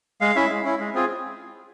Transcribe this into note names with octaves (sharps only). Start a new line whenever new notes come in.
G#3 F5
C#4 E4 E5
G#3
C#4 E4
G#3
C4 F4 G#4